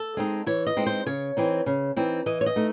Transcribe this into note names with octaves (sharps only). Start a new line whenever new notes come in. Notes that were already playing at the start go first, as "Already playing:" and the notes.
Already playing: A4
G#3 C4 D#4
E3 C#5
D#5
G#3 C4 D#4
C5
C#3 C#5
E3 C4 D#4
C#3
E3 C4 D#4
E3 D#5
C#5
D#5
A3 D#4